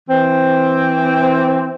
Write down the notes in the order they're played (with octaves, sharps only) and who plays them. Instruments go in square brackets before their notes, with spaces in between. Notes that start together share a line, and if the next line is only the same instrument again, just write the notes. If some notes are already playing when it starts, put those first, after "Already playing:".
[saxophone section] E3 C4